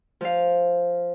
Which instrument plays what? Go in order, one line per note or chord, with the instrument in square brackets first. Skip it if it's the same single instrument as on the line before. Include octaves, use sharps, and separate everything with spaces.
[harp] F3 F5